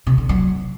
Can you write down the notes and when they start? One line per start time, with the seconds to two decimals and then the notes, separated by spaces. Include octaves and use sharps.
0.07 C3
0.18 D3
0.29 F#3